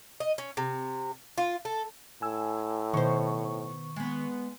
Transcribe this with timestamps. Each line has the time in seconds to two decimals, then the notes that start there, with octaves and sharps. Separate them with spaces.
0.20 D#5
0.38 C#4
0.57 C3
1.38 F4
1.65 A4
2.22 A2 G#5 E6
2.94 B2 D#3 C5 C#6
3.96 G#3 B3